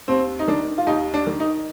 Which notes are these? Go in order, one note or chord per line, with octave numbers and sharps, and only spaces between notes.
D#2 C4
D#4
D#3 D4
F4
D#2 D#4
D4
D#3
D#4